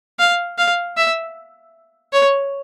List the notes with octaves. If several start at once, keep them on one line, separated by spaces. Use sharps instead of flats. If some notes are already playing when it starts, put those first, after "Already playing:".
F5
F5
E5
C#5